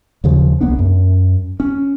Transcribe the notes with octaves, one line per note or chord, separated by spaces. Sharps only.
D#2 C#3 F3
C2 A#3 B3 D4
F#2
C#4